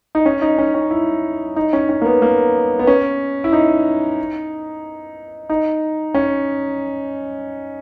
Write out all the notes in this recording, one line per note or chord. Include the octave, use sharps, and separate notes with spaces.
D#4
C#4
D#4
C#4
C#4
E4
D#4
C#4
C#4
A#3
B3
A#3
B3
C#4
E4
D#4
D#4
C#4